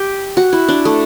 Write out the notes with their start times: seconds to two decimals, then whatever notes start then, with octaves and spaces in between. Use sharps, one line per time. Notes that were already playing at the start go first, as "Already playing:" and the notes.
Already playing: G4
0.37 F#4
0.53 E4
0.68 D4
0.85 A3